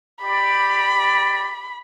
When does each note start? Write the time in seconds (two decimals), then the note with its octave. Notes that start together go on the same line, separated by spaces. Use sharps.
0.23 G4 D5 B5